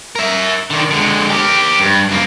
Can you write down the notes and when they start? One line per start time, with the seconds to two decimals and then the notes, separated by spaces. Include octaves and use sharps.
0.16 A#4 E5
0.70 D3 D#3
0.90 D3 G#3
1.29 G4 A#4
1.80 G2
2.09 F#2 A#3